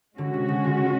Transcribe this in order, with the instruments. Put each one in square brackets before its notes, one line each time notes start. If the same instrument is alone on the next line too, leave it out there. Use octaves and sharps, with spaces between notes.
[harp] D3 [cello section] G#3 C#4 F#4
[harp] C3
C#3
D3